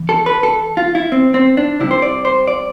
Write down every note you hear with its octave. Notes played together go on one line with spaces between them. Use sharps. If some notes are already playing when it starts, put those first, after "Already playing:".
Already playing: E3
A4
B4
A4
F4
E4
C4
C4
D4
C3 G3 E4
C5
D5
C5
D5